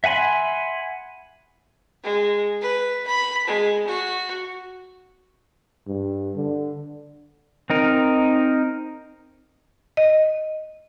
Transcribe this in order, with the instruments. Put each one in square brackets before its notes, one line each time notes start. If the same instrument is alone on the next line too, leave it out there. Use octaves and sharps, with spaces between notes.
[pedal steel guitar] E5 F#5 G#5 B5 C6
[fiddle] G#3
B4
B5
G#3
F#4
[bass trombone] G2
D3
[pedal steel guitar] C4 D#4 A#4
[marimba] D#5